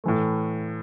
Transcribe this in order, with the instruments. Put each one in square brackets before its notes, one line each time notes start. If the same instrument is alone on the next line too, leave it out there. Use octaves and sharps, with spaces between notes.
[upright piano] A2 E3 A3